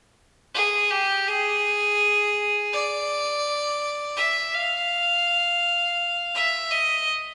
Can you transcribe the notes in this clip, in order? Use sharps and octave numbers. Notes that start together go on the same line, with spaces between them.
G#4
G4
G#4
D5
E5
F5
E5
D#5